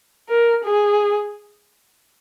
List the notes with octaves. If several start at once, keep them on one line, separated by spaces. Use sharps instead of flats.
A#4
G#4